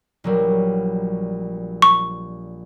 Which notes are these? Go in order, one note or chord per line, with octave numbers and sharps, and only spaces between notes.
A#1 F#3 G3
C#6